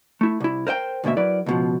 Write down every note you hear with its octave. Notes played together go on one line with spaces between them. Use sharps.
A3 E4
C2 E4
A#4 C5 D#5 G5
D2 G#2 B2 A#3 E5
F#3 E4 A#4 B4 D5
C#2 B2 F3